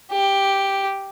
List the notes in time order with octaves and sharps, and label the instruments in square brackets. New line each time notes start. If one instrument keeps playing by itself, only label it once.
[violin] G4